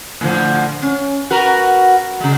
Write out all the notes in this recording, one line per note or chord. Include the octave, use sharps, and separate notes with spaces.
A2 D3 F3
C#4
F#4 A#4 B4
C#3 G#3